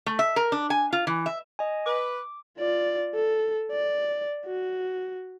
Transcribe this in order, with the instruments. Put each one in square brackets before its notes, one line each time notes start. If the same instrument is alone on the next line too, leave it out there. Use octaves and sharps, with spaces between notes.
[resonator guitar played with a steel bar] A3
E5
A#4
D4
G#5
F4
E3
E5
[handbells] D#5 G#5
[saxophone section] B4 [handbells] D6
[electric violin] F4 D5
A4
D5
F#4